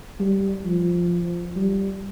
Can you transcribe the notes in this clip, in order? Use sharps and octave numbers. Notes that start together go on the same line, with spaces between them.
G3
F3
G3